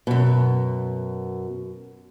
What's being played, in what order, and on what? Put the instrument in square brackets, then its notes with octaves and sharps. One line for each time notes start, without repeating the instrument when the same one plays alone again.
[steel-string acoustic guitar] F#2 B2